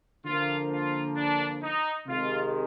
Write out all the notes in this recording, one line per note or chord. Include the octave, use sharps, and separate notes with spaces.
D3 F3 A#3 F4
F4
D4
D#4
C3 D#3 G#3 F4